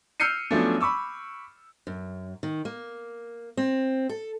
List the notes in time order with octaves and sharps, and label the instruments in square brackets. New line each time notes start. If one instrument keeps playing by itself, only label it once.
[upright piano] E6 F6 G6 C7 C#7 D#7
F3 F#3 A3 B3 C#4 D4
B5 C#6 D6 E6
[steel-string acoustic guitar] F#2
D#3
A#3
C4
A4